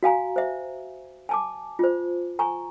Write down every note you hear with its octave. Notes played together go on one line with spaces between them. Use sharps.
F#4 F5 G#5 A#5
C5 E5
G#5 A5 D6
F4 C5
G#5 A#5 C#6